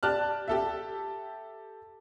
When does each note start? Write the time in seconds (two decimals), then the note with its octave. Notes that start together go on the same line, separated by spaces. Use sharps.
0.03 G4 D5 A5 F6 F#6
0.48 G4 A4 E5